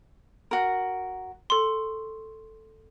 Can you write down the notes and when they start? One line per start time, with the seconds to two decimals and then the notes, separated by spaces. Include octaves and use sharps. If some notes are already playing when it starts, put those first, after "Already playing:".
0.51 F#4 A#4
1.50 A4 C6 C#6